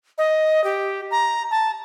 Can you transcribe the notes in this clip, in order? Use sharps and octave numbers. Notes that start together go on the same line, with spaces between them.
D#5
G4
A#5
A5